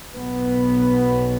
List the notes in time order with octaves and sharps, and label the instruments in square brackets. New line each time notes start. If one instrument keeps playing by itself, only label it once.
[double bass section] B1 B2 B3